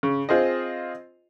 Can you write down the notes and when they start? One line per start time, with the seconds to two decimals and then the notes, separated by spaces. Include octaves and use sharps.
0.03 C#3
0.29 C4 F4 G#4 C5 D#5